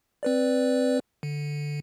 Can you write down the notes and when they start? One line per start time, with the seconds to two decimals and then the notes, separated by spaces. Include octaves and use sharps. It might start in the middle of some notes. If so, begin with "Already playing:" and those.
0.23 C4 B4 D5
1.23 D3